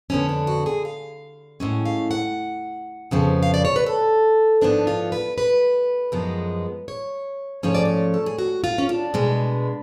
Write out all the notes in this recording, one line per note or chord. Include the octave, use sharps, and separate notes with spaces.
F2 D3 G#3 B3 C#4
D4
F#4
G#4
F5
A2 G#3 C#4 F#5
F5
F#5
F2 C#3 F3 B3
F5
D5
C#5
B4
A4
G#2 F3 B3 D4
F4
B4
B4
F#2 F3 G#3 B3
C#5
G#2 F3 A3 C#4 C#5
D5
C#5
A4
G#4
F#4
F4
C#4
D4
B2 G#3 B3